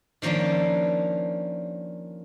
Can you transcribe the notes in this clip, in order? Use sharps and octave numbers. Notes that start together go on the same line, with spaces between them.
D#3 F3 A#3 C#4 D4